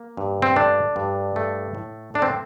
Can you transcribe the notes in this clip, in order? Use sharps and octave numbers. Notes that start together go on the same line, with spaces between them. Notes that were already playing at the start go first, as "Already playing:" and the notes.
Already playing: A#3
G2
C4
A3 D4
G2
A3
A2
A3 D4
C4